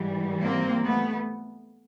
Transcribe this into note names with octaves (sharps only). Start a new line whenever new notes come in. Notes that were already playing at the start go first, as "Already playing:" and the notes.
Already playing: G#2 E3 G3
A#3 C4
A3 B3